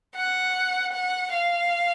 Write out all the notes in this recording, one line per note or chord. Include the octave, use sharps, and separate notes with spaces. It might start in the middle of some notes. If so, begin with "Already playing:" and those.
F#5
F#5
F5